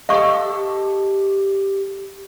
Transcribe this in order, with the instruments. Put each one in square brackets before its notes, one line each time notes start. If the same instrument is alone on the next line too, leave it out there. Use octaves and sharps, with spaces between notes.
[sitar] G4 A4 [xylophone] D#5 [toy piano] F5 C#6